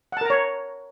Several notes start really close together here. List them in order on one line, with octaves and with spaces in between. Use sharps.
F#5 A5 A#4 A#5 C#5